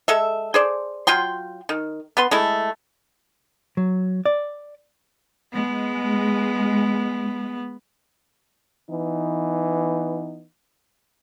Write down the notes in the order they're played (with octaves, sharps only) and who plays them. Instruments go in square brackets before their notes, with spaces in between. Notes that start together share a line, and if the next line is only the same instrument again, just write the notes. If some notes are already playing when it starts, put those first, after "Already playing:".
[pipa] G#3 A4 E5
G#4 C5 D5
F#3 F4 G5 C6
D#3
B3 B4 C6
G#3 A3 E4
[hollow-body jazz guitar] F#3
D5
[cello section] G#3 [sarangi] B3
[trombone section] E3 B3 D#4